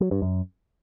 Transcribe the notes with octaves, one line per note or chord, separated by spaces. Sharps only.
F#3
G2
F#2